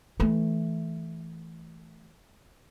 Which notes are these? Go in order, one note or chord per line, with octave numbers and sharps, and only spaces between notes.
E3 A3